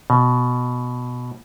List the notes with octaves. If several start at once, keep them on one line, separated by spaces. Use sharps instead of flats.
B2